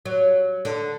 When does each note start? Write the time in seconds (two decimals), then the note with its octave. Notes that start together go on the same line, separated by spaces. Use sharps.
0.06 F#3
0.65 D3